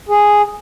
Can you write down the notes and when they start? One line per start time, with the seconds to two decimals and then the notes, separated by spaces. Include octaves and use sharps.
0.09 G#4